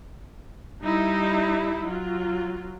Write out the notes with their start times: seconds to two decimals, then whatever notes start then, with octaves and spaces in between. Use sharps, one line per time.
0.83 G3 D#4 E4
1.85 F#3 F4